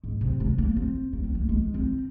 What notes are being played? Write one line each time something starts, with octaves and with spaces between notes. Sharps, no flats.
G#2
C3
G#3
A#3
C4
A#3
C4
A#3
G#3
C4